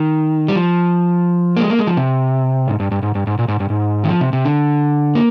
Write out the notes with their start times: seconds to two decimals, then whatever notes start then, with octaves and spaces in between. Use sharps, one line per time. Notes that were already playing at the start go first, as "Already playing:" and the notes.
Already playing: D#3
0.48 G3
0.55 F3
1.57 A#3
1.61 G#3
1.70 A#3
1.79 G#3
1.87 F3
1.97 C3
2.68 G#2
2.80 G2
2.91 G2
3.03 G#2
3.15 G2
3.27 G#2
3.39 A#2
3.48 G#2
3.60 G2
3.70 G#2
4.04 D#3
4.08 F3
4.21 C3
4.33 C3
4.45 D3
5.15 A#3